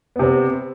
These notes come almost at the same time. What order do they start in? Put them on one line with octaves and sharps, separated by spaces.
B3 C3 C4